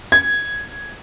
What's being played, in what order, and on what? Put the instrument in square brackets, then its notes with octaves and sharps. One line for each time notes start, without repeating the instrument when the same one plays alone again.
[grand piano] G#6